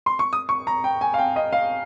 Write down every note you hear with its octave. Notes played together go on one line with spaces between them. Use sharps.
C6
C#6
D#6
C#6
A#5
G5
G#5
F5
G5
D#5
F5